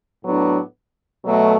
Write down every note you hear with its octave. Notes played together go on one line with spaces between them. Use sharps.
A2 F#3 B3 D4
B2 F#3 A3